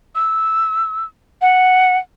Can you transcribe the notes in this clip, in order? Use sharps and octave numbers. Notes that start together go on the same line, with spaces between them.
E6
F#5